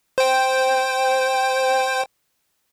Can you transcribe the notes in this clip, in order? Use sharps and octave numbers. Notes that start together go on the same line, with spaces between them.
C5 G5